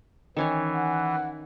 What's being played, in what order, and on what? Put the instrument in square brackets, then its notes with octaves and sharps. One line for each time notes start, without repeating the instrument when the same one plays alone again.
[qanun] D#3 C#4 C#5 [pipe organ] E3
[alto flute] F#5